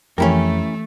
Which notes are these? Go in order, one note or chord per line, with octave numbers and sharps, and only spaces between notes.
F2 E3 A3 C#4 E4 G4 A#4 G5